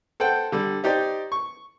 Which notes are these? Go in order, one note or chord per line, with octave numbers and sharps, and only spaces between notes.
A4 C5 F#5 G5
D3 G3
D#4 G4 C5 D5
C#6